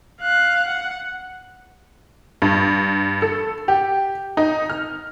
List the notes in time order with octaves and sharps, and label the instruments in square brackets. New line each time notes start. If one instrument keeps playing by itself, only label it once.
[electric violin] F5 F#6
F#5
[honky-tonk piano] G2
A4
G4
D#4
F6